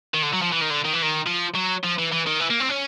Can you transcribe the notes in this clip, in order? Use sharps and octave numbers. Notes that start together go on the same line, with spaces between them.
D#3
D3
F#3
F3
E3
D#3
D3
D#3
E3
D#3
F3
F#3
F3
E3
E3
D#3
E3
A#3
C4
C#4